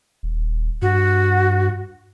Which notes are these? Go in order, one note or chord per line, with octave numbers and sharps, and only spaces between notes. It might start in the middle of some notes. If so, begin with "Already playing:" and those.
D#1
G2 F#4